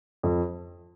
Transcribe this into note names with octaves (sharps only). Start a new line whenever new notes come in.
F2